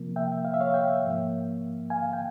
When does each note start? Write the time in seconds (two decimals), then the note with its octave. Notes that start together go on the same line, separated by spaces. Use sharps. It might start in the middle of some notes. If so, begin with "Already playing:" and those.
Already playing: C3 F3 A#3
0.16 E5 G5
0.45 F5
0.54 E5
0.61 C#5 F5
0.74 E5 G5
1.04 G#2 F3 A#3
1.90 F5 G#5
2.13 G5